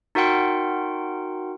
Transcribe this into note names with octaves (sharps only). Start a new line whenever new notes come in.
D#4 F#4 A#4 F#5 G5 C6